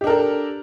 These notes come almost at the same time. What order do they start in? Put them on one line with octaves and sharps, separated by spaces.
G4 D4 A#4 A4